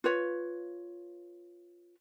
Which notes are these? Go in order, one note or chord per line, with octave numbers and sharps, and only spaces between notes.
F4 B4 C#5